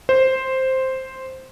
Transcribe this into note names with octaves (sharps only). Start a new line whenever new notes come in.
C5